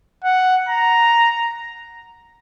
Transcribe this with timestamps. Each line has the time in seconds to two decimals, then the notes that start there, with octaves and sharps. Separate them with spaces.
0.24 F#5
0.69 A#5